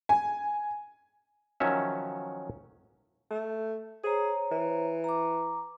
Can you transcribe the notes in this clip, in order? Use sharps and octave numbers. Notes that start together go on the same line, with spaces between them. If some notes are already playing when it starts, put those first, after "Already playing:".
G#5
D#3 F3 F#3 C#4 C#5 E5
A3
G#4 C5 C#5 A#5
E3
A#5 D6